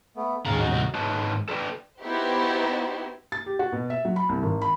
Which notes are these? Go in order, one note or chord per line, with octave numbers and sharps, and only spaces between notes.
A3 B3
D#2 A2 C#4 G#4 F5 A#5
G#2 C#4 D#4 F#4 A5
C2 D7
G#2 D#3 B4 C#5 D#5 A5
A4 B4 D5 G5
B3 D#4 E4 F#4 G4 C5
A6
G4
F#4
B2
E5
F#3
B5
C2
G#1
B5